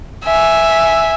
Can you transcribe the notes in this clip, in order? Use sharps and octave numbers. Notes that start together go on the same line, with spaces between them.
E5 G#5